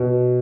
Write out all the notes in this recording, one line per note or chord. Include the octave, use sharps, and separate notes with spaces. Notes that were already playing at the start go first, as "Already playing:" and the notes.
Already playing: B2